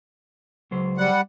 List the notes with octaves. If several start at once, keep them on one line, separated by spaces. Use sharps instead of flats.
C#2 F#3 C5
G3 F#5